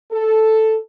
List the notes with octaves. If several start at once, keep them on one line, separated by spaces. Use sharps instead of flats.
A4